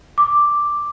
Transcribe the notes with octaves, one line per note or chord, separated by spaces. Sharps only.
D6